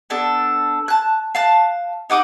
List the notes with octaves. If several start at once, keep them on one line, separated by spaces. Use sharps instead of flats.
B3 D4 A4
A5 F#6
F5 A5 F#6
D#4 F#5 D6 D#6